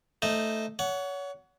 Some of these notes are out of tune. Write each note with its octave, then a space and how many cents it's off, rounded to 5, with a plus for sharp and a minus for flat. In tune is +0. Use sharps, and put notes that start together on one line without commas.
A3 +0 D#4 -5 C5 +0
C#5 +30 F#5 +0